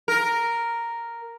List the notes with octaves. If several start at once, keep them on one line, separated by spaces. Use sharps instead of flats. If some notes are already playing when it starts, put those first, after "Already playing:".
A#4